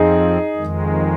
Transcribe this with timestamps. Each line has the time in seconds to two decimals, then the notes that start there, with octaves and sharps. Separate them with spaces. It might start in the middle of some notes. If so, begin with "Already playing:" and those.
Already playing: F2 F3 C4 D#4 G#4
0.56 F2 D#3 G#3